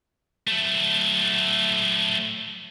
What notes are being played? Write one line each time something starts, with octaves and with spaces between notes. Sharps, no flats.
F#3 A3